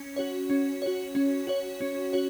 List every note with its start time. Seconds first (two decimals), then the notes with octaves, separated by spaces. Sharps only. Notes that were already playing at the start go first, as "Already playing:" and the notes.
Already playing: C#4
0.16 F#4 C#5
0.50 C#4
0.82 F#4 C#5
1.15 C#4
1.47 F#4 C#5
1.81 C#4
2.13 F#4 C#5